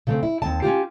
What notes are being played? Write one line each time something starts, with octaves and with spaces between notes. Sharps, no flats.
C#3 A3 C4
E4
D#2 C4 A5
C#4 D4 F4 G4